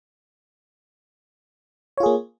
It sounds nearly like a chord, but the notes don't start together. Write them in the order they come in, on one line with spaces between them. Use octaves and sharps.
C#5 F4 G#4 A#3